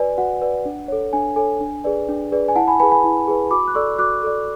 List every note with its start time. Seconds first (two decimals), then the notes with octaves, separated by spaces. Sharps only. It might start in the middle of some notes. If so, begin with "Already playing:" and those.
Already playing: F#4 B4 D5 G#5
0.18 F#4 F#5
0.41 B4 D5
0.65 D4
0.88 A4 C#5
1.13 D4 G#5
1.36 A4 C#5 G#5
1.61 D4
1.84 G#4 B4 D5
2.09 D4
2.32 G#4 B4 D5
2.48 G#5
2.55 E4 F#5 A5
2.68 G#5 B5
2.80 G#4 B4 G#5 B5
2.92 G#5 B5
3.04 E4
3.28 G#4 B4
3.51 F#4 B5 D6
3.68 F#6
3.75 A4 D5 C#6 E6
3.99 F#4 D6 F#6
4.23 A4 D5